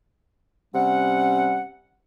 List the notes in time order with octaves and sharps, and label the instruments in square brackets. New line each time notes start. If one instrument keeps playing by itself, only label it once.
[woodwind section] C3 G3 C#4 F#5